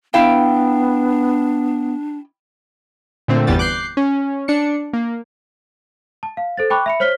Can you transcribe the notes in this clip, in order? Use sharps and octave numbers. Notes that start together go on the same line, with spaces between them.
B3 D4 E4 F5 G5
A#2 D3 A3 C4
G1 E2 E3 G3 B3 A6
D6 F#6 G6 C7
C#4
D4 C#7
A#3
A5
F5
A4 C5 A6
G5 A5 B5 C#6 D6 F#6
E5 B5 C#7
C5 C#5 F6 B6 G7